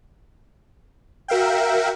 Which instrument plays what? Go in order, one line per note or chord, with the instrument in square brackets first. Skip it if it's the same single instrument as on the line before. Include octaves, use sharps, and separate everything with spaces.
[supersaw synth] F#4 A#4 E5 F5 G5